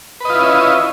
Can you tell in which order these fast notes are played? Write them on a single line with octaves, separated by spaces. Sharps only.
B4 D#5 F4 E4 C#4